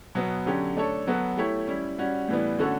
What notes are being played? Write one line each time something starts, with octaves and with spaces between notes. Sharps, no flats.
B2 F#3 B3
D3 F#3 C#4 G4
A3 D4 A4 C#5
F#3 B3 F#4 A4
A3 E4 G4 C#5
G3 C#4 E4
G3 C#4 F#4
A2 E3 G3 B3
D3 A3 C#4 F#4 A4